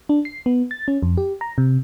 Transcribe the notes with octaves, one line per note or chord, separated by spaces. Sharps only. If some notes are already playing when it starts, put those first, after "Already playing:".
D4
C7
B3
A6
C#4
F2
G4
A#5
C3